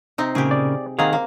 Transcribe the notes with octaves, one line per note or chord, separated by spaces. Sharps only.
C3 C4 D#4
A#2 C#3 A#3 G4 G#4
D5
D#3 A#3 C4 G#4 F5 F#5
A#3